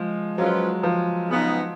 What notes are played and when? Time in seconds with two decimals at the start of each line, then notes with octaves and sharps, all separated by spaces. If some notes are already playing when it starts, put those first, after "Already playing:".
Already playing: F3 G#3
0.38 F3 F#3 G#3 C#4 F4 B4
0.83 F3
1.29 C#3 G#3 B3 D#4